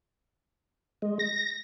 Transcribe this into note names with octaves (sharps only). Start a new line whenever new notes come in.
G#3
A#6